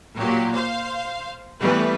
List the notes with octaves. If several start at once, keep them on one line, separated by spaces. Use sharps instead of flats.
A#2 F#3 G4
C5 F5
E3 G3 A3 B3 B4